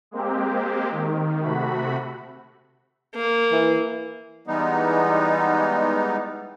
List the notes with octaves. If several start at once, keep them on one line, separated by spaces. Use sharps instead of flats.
G#3 A#3 C4 G4
D#3
C3 A3 F#4 B5
A#3
E3
E3 G3 G#3 B3 D#4